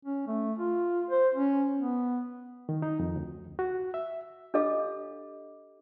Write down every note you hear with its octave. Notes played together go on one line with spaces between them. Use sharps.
C#4
A3
F4
C5
C#4
B3
D#3
D#4
F2
D2
F#4
E5
D4 G4 A4 D#5 F5 D6